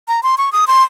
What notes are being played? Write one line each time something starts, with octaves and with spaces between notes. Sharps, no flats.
A#5
C6
C#6
D#6
C6